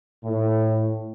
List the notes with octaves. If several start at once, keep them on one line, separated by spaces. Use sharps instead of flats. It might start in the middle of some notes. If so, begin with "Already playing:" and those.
A2